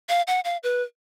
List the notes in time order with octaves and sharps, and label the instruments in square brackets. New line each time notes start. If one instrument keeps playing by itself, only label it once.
[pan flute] F5
F#5
F5
B4